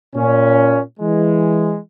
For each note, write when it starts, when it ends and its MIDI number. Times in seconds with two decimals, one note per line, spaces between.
0.15 0.81 46
0.15 0.81 61
1.00 1.78 52
1.00 1.78 56